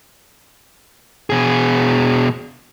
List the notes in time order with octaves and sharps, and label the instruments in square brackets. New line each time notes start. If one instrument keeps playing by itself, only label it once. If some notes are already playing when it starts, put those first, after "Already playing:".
[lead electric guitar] B2 G#4